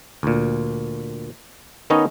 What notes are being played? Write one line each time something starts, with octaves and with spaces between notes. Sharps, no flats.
D2 A#2
D#3 B3 C#4 D#4 C#5 D#5